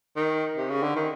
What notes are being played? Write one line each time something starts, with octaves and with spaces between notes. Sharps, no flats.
D#3
C3
C#3
D3
D#3